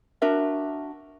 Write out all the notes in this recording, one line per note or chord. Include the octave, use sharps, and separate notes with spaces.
D4 F#4 A#4 E5